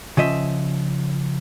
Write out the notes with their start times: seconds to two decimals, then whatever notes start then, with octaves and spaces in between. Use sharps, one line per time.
0.17 C#3 F3 D#5 E5